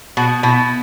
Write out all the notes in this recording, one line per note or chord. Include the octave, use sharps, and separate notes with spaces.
B2 F#4
B2 E4